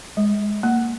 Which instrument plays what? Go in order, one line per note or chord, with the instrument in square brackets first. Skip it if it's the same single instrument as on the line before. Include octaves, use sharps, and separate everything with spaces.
[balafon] G#3
A#3